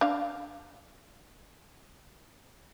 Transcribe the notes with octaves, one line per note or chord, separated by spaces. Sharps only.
D4 F5